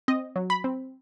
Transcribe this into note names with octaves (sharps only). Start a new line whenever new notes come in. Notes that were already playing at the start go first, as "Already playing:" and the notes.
C4 D#5
F#3
B5
C4